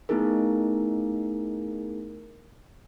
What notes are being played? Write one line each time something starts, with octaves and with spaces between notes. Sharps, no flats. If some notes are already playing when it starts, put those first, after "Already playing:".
A3 B3 D#4 E4 G#4 A#4